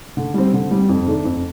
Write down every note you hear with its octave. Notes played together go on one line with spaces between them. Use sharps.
D3
G3 C4
D3
G3 C4
F2
D#3 A3 D4 A4
F2